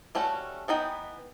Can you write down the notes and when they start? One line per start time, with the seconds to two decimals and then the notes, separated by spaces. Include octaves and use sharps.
0.15 G3 A3 C#4 F#4
0.68 E3 B3 D#4 G5